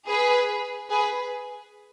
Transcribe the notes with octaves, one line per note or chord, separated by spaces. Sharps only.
G#4 B4
G#4 B4